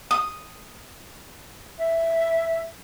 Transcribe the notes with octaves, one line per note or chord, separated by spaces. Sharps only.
D#6
E5